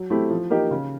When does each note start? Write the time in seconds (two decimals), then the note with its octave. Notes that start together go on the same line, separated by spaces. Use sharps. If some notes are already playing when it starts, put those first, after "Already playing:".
Already playing: F#3
0.10 A3 C4 E4 G4
0.30 F3
0.50 A#3 D#4 G4 A#4
0.71 C#3